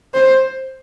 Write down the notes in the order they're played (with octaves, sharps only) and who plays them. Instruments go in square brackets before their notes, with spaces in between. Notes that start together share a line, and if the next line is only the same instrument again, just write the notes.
[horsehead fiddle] C5